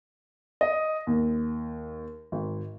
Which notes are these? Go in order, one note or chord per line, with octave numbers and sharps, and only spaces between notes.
D#5
D#2
G#1